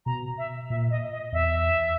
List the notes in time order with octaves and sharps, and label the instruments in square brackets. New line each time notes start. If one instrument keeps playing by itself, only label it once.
[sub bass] B2 [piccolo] A#5
[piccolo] E5
[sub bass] A#2 [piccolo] E5
[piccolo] D#5
D#5
[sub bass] E2 [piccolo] E5